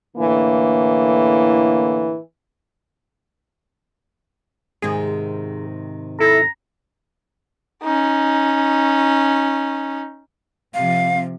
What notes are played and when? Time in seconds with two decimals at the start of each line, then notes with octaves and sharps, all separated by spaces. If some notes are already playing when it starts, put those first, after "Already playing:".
0.17 A2 D3 E3 A#3
4.82 G#2 C3 D#3 G#4
6.20 E4 A4 A#5
7.83 C#4 D#4
10.74 C3 F3 F5